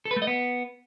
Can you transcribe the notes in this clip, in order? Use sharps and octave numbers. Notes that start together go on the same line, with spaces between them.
A4
B4
A3
D#5
B3